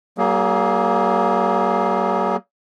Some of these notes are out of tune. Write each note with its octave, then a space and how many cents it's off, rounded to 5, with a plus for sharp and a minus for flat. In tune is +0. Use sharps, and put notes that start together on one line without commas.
F#3 +45 A#3 +0 G#4 +20